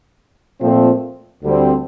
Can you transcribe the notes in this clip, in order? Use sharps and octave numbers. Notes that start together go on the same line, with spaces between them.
A#2 F3 A3 C4
D2 D3 G3 C4